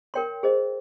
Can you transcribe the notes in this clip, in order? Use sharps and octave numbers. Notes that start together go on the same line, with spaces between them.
A#4 C#5 G5 C6
G#4 C5 D#5